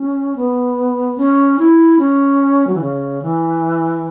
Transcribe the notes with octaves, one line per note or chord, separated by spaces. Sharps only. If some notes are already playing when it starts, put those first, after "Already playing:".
Already playing: C#4
B3
C#4
E4
C#4
F#3
E3
C#3
E3